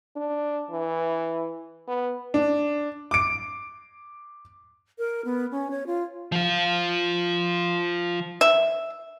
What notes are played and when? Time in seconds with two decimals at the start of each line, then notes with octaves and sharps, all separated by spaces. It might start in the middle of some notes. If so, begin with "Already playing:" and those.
0.16 D4
0.71 E3
1.88 B3
2.34 D4
3.11 D6 D7
4.98 A#4
5.25 B3
5.52 C#4
5.71 C#5
5.87 F4
6.32 F3 F4
8.41 E5